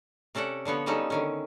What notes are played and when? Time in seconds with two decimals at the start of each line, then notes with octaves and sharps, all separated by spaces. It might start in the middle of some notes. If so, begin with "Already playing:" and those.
0.35 C3 C#4 A4 D5 F#5
0.65 D3 F3 B3 C#5
0.86 F3 G3 G#3 C#4 D#4 A4
1.10 D3 D#3 C#4